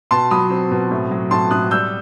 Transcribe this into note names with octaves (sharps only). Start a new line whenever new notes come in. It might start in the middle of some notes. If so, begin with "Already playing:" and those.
B2 A5 C6
F#3 B5 D#6
C4
B2
A2
F#3
A2 A5 C6
A2 D#6 F#6
G3 E6 G6